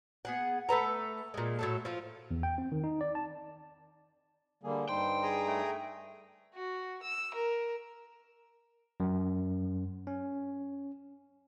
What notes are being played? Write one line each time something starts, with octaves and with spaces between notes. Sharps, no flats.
B3 G#4 F#5
A3 A4 B4 A#5
A#2 G#3
A2 F#3 A4
F3 F4
E2
G5
C4
D#3
D#4
D5
A5
D3 G3 A#3 G#4
G2 G3 D#4 C5 G5
G#4 A#5 D#6
A3
F#4
E6
A#4
F#2
C#4